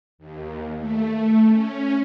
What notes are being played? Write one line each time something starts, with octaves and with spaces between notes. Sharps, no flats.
D#2
A3
A3
C#4